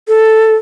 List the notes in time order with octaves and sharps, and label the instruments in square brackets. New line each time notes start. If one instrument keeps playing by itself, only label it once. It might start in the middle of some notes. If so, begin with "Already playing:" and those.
[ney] A4